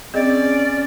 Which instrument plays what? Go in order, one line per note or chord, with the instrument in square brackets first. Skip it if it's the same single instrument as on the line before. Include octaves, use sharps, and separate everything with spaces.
[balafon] C4 G#4 D#5 [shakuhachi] C#4 [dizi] D5